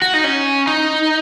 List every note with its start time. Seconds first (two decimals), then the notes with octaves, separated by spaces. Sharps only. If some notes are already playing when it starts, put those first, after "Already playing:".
0.02 F#4
0.14 D#4
0.24 C#4
0.67 D#4